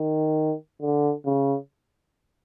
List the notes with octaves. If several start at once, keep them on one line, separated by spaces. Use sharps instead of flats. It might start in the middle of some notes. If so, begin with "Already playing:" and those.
Already playing: D#3
D3
C#3